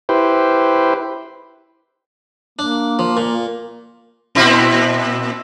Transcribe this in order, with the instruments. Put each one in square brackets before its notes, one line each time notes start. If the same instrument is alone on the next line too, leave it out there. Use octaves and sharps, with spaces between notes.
[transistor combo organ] E4 G4 B4 C5
[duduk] A#3 [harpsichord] D4
[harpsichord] F3
A#2
[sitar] A#2 C4 E4